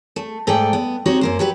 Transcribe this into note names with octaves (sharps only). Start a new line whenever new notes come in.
A3
G#2 A3 A4 D5 G5
B3
C4 C#4 D#4 F#4 G4 C#5
F#2 A#3 C5
F#3 G4 B4